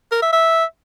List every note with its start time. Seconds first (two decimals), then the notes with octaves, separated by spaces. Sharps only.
0.12 A#4
0.22 E5
0.33 E5